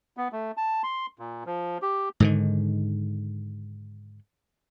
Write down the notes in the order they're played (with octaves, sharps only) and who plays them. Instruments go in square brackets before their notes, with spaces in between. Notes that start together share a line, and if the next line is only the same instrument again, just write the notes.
[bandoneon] B3
A3
A5
C6
A#2
F3
G4
[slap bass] G#2 D3 D#3